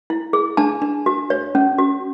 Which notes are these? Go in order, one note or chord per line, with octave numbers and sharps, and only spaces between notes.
E4
G#4
D4 A5
D4
F#4
C#5
C#4
F#4